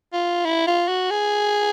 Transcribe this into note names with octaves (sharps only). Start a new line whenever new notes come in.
F4
E4
F4
F#4
G#4